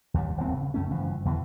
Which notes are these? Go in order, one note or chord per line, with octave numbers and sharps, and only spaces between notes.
D#2 G3
D#1 G#1 E2 C4
C#3
F#2 A3 C#4
F#1 G2 E3 F3
E2 B2 D3 E3